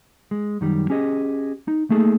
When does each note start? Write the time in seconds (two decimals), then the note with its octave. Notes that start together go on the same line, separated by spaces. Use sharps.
0.31 G#3
0.61 F#2 D#3 G3
0.90 C#4 G4 G#4 D#5
1.68 D#4
1.90 A3 A#3 D#4 G#4 A4